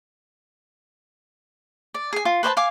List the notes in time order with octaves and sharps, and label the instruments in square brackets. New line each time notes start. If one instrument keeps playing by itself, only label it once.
[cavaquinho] D5
G#4 G#5
F4
B4 C5 D5 A5
F5 G#5 D6